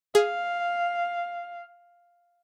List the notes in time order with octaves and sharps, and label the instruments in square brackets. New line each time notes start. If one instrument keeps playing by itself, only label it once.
[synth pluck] G#4 [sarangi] F5